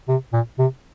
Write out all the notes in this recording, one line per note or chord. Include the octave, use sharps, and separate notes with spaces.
C3
A#2
C3